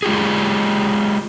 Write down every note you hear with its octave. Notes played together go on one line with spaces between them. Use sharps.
G#3 F4 G4 G#4